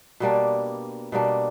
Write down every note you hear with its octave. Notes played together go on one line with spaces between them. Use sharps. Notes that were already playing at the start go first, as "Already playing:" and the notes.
B2 G3 A#3 D4
B2 G3 A#3 D4